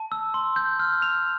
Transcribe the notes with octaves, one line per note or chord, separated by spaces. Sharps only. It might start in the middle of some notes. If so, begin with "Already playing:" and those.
Already playing: A5
E6
C6
G6
F6
F7